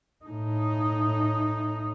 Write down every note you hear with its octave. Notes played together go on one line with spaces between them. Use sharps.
A2 D#4